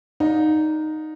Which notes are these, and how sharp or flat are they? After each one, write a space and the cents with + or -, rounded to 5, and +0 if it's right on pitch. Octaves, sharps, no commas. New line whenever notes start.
D#4 -5 D5 -15 F5 +40